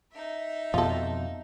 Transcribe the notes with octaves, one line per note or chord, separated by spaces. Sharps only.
D#4 E5
F2 B2 F4 A4